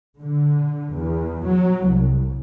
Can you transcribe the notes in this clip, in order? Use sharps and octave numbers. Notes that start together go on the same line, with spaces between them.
D3
E2
F#3
C2